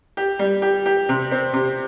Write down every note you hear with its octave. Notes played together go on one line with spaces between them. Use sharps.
G4
G3
G4
G4
C3
C4
C3